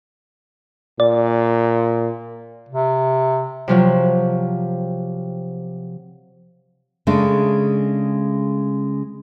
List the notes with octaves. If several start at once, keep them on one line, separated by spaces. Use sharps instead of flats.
A#2 D5
C3
C3 F3 F#3
C#3 G#3 A3 D4